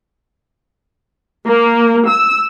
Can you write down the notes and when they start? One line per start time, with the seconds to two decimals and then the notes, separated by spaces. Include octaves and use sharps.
1.47 A#3
2.08 E6